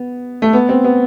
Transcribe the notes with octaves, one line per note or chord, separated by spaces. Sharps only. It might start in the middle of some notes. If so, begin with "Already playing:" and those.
Already playing: B3
A3
B3
C4
B3